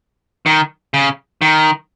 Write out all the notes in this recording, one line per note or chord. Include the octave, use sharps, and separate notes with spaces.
D#3
C#3
D#3